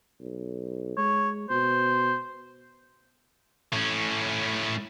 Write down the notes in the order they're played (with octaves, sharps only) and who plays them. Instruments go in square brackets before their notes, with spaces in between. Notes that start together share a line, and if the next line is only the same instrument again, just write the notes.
[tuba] B1
[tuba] G#3 [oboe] C#5
[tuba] B2 [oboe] C5
[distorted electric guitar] A2 C#4